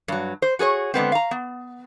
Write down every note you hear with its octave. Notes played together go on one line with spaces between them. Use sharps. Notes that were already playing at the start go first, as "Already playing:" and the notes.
G2 F#3
C5
F#4 G#4 A#4 C#5
D3 G#3 B3 C4
F5 A#5
B3